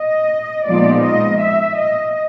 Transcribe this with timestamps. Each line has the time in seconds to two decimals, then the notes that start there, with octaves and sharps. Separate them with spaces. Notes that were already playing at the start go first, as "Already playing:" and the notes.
Already playing: D#5
0.66 A#2 F3 G#3 B3 D#4 D5
1.03 D#5
1.41 E5
1.77 D#5